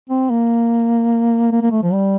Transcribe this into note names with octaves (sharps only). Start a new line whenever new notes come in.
C4
A#3
A#3
A#3
A3
F3
G3